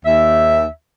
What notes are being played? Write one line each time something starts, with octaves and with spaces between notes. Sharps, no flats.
D#2 E5